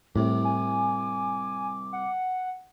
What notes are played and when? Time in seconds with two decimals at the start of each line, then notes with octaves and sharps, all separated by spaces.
0.16 C2 A2 C3 D6
0.45 G#5
1.93 F#5